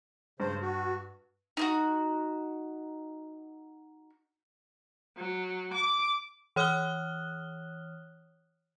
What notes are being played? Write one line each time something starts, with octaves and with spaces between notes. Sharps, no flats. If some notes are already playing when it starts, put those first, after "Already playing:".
G2 C#3 C5
F#4
D#4 E4 F#4
F#3
D6
E3 C#5 D#6 F6 F#6 G7